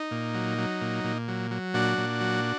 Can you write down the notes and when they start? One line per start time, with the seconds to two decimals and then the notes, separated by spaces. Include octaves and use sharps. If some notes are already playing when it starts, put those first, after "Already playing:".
Already playing: D#4
0.11 A#2
0.34 F#3
0.58 F#3
0.81 A#2
1.04 A#2
1.28 F#3
1.51 F#3
1.74 A#2 D4 F#4
1.98 A#2
2.21 F#3